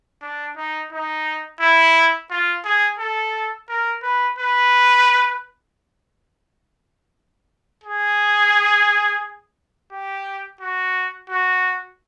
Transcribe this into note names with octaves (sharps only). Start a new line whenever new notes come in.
D4
D#4
D#4
E4
F4
G#4
A4
A#4
B4
B4
G#4
G4
F#4
F#4